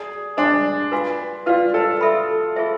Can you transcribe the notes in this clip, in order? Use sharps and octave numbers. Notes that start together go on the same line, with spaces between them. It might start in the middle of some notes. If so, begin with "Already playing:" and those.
Already playing: G#4 D5 A5
D4 C5 G#5 C6
F4 B4 F5 G#5 C6
F4 B4 D5 F5
A4
A4 E5 B5
F4 G#4 C5 E5